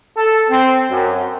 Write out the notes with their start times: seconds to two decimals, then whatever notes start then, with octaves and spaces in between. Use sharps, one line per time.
0.15 A4
0.49 C4
0.89 F#2